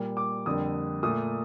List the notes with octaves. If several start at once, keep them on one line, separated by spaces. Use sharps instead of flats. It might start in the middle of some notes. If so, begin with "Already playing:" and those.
Already playing: A#2 G3 A#3
D6
F2 D3 G3 A#3 D#6
A#2 A3 D#6